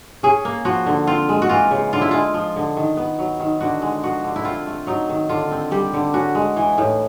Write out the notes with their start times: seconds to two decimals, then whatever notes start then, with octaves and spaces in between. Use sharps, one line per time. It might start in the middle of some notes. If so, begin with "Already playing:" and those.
0.23 C#4 G#4
0.45 A#3
0.65 F3 F#4
0.86 D3
1.07 C4 F4
1.29 G#3
1.42 F#4
1.49 E3 F4
1.71 C#3
1.93 D3 F4
2.02 E4
2.11 G#3 F4
2.34 F3
2.56 D3
2.77 D#3
2.97 B3
3.19 F#3
3.40 D#3
3.60 D3 F#4
3.82 G#3
4.03 F3 F#4
4.24 D3
4.36 E4
4.45 C4 F4
4.67 A3
4.87 F#3 D#4
5.09 D#3
5.29 D3 F4
5.51 C4
5.71 G3 G4
5.93 D3
6.14 C#4 F#4
6.35 G#3
6.56 E3
6.78 A2